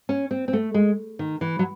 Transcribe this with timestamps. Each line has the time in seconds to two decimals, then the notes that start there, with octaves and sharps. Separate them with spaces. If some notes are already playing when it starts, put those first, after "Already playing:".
0.09 C#4
0.31 C4
0.48 C4
0.53 A3
0.74 G#3
1.19 D#3
1.41 E3
1.59 F#3